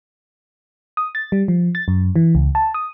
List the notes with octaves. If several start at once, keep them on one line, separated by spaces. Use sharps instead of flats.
D#6
A6
G3
F3
A6
F#2
E3
C#2
A5
D#6